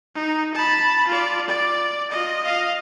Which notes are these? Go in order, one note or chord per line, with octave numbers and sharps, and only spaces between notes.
D#4
A5 B5
F4 D5
D5
F4 D#5
D#5 F5